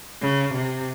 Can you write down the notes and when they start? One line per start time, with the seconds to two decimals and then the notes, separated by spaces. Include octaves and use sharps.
0.22 C#3
0.54 C3